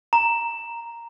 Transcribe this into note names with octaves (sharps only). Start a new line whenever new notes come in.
A#5